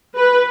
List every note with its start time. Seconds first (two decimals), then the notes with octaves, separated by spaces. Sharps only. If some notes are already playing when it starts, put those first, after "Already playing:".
0.16 B4